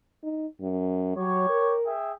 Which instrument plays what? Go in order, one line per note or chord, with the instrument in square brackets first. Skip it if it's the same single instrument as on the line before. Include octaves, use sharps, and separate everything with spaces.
[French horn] D#4
F#2
[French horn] F#3 [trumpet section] G4 C#5
[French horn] A#4
[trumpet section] G#4 E5 G5